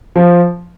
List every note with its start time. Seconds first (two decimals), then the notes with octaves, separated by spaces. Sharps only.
0.16 F3